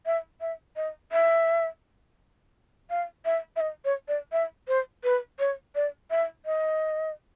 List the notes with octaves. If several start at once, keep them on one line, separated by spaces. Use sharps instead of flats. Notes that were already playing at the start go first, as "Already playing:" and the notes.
E5
E5
D#5
E5
F5
E5
E5
D#5
C#5
D5
E5
C5
B4
C#5
D5
E5
D#5